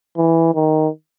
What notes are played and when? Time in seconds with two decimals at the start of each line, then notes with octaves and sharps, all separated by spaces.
0.17 E3
0.55 D#3